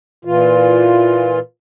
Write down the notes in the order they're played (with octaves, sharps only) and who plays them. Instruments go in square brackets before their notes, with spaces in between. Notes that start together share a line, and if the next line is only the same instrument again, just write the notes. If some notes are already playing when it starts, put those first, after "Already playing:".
[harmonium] A#2 E3 F4